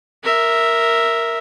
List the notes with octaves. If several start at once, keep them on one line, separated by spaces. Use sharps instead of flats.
A#4 E5